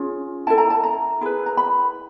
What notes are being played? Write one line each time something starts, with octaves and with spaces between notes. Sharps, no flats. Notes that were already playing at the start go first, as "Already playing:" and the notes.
Already playing: C#4 F4 G#4
E4 A4 A5
A#5
A5
A#5
E4 G#4 B4
A#5
B5